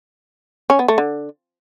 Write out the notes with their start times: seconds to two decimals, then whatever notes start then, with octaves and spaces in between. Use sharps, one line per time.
0.70 C#4
0.79 B3
0.88 A3
0.98 D3